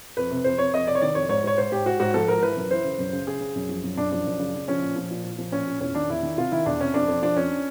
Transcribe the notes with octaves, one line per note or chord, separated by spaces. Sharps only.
F2 B4
C3
F2 C5
C3 C#5
F2 D#5
C3 D5
C#5
D#3 D5
F2 C#5
G#2 C#5
G#2 C#5
G#2 C5
G#2 G4
G#2 F#4
G#2 F#4
F3 A4
G#2 A#4
E3 B4
F#2
E3 C5
C#3
F#2
C#3
C#3 G#4
C#3
F#2
F3
F#2
F#2 D4
F3 D4
F#2
C#3
C#3
F3 C#4
A#2
F3
A#2
A#2
F3
A#2 C#4
A#2
E2 C#4
D#3 D4
E2 E4
D#3
C3 F4
D#3 E4
E2 D4
C3 C#4
F2 D4
F2
F3 D4
F2 C#4